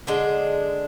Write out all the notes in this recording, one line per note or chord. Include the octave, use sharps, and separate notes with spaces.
D3 G#3 D4